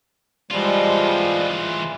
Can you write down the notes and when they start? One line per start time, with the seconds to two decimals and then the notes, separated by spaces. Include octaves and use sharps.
0.51 E3 F3 G3 G#3 F4